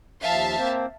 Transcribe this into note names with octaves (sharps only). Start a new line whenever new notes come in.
D#2 F3 E5 F5 A5
A#3 C4 C5